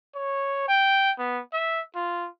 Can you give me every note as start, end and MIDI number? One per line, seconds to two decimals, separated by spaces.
0.15 0.64 73
0.68 1.12 79
1.19 1.40 59
1.53 1.81 76
1.95 2.28 65